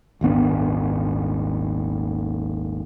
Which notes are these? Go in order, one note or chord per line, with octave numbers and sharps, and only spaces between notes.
D#1 G#1 B3 D4